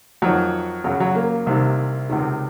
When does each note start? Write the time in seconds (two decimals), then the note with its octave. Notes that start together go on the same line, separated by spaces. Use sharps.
0.22 F2 D#3 F#3
0.84 F#2 C#3 F#3
1.00 F#3
1.15 A#3
1.47 C2 C3 D#3
2.09 C#2 C3 D#3